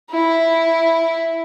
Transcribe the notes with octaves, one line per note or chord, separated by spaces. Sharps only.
E4